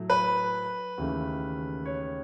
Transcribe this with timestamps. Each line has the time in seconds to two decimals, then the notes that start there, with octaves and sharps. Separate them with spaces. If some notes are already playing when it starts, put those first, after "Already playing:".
Already playing: A2 F#3 A3
0.10 B4
0.98 D#2 C#3 E3 A3
1.85 C#5